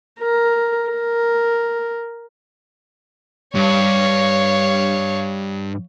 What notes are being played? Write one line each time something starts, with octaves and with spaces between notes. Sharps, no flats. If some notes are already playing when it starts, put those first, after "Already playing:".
A#4
A#4
G2 C#5 F5